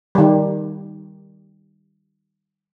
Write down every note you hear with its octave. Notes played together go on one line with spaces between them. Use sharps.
D#3 G3